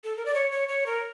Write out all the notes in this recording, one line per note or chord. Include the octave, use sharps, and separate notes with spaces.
A4
A#4
D5
C#5
C#5
C#5
A#4